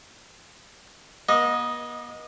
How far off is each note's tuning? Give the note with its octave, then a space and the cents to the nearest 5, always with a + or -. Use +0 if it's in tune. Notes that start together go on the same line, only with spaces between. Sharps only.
B3 -45 D#5 +0